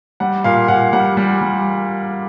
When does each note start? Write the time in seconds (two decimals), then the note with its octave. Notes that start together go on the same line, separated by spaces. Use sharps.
0.20 G3 F#5
0.44 A#2 F5
0.68 A#2 F#5
0.93 G3 F#5
1.17 G3
1.41 G3